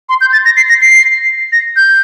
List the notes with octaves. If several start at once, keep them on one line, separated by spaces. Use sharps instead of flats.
C6
G6
A6
A#6
C7
A#6
C7
A#6
G6